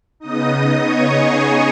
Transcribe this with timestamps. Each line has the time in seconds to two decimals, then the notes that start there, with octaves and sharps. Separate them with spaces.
0.20 C#3 B3 D#4 D#5 D#6
0.81 C#5 C#6
1.12 G#4 G#5